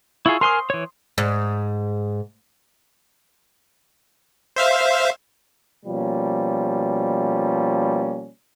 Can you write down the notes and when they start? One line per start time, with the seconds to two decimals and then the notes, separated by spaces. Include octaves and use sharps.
0.26 E4 F4 G#4 C#6 E6
0.41 A#4 G#5 C6 D#6 F6
0.70 E3 C#5
1.18 G#2
4.56 C5 E5 F5
5.86 B2 F3 G3 A#3 C#4